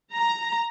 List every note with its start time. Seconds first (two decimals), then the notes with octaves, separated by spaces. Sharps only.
0.14 A#5